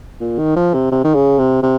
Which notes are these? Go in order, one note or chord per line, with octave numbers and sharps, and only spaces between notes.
A#2
D#3
F3
C3
C3
D#3
C#3
C3
C3